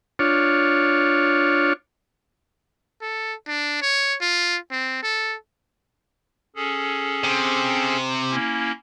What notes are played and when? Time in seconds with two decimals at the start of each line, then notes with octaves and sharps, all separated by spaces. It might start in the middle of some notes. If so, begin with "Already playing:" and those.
0.19 D4 F4 C#5
3.02 A4
3.48 D4
3.82 C#5
4.21 F4
4.71 C4
5.03 A4
6.56 C#4 G#4 A4
7.24 C3
8.31 A#3 C#4 E4